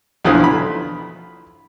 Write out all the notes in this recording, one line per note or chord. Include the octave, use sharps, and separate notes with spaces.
B1 D3 E3 F3 D#6
B5